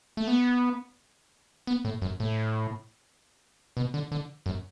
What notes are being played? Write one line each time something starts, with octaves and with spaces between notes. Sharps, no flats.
A3
B3
B3
A2
F#2
A2
B2
D3
D3
F#2